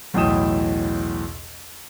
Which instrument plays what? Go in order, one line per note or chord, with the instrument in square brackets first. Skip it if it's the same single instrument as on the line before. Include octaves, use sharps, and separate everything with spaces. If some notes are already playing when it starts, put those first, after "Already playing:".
[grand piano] B1 E2 A2 G5 D#6 E7